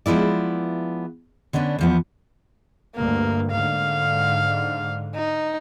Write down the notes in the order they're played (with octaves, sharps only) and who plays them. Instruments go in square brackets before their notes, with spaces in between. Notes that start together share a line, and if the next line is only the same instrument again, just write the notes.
[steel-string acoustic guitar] F3 G#3 B3 E4 D5
D3 B3 C#4 D4
E2 F3 B3
[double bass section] D2 G2 [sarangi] A#3
[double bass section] G#2 D3 [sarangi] F5
[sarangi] D#4